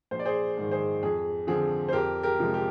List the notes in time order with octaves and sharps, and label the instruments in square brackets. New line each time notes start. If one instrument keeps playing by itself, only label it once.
[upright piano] A#1 C5
D5
G#4 C5
G#2 D#3
G#4 C5
F2 G#4
D3 F3 C4 G#4
C5
F2 G4 A#4
G4 A#4
C3 F3 G#3
G4